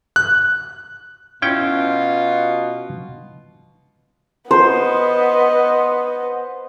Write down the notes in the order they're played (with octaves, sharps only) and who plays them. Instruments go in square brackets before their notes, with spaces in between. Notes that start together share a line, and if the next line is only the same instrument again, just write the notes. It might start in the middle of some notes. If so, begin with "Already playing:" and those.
[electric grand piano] F#6
[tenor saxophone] B2 [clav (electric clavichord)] C#4 E4 G5 [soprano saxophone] F4
[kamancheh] B3 D#5 [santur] C5